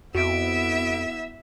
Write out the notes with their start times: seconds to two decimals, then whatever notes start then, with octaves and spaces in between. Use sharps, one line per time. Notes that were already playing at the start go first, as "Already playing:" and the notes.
0.15 F2 B3 E4 F#4 E5 D7